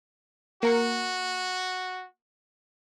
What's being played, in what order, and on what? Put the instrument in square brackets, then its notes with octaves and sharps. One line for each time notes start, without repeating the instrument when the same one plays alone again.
[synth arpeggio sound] A#3 A#4 C#7 [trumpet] F#4